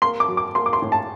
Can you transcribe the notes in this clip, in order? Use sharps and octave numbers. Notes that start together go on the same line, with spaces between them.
A#3 C6
D6
F#3
D6
A#3 C6
D6
C6
A2
A5